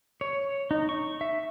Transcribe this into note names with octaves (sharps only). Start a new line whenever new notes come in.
C#5
D#4
C#6
E5